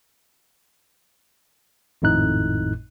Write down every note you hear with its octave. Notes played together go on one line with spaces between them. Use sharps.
G#1 F2 A2 D#4 F#6